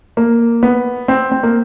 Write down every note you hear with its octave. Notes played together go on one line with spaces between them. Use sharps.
A#3
B3
C4
C4
A#3